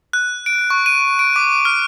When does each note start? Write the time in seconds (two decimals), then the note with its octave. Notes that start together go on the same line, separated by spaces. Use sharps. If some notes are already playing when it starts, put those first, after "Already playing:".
0.13 F#6
0.46 D7
0.70 C#6
0.86 D#7
1.19 D7
1.36 D6
1.65 F6